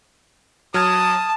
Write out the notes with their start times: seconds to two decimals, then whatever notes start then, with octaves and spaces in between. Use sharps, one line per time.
0.74 F#3 A5 D#6 F6 G#6